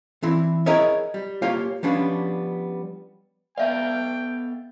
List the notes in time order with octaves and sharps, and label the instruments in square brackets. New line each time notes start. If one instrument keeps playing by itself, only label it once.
[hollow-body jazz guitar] E3 C4 E4
E4 G#4 A#4 C#5 D#5 E5
G3
A#3 F4 G4 C#5 F5
F3 G3 B3 C#4 D4
[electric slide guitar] B3 A4 F5 [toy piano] D5 E5 A5 [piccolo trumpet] G5